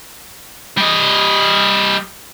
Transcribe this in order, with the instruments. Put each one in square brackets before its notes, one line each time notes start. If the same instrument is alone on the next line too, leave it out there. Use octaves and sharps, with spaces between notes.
[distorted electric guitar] G3 D#5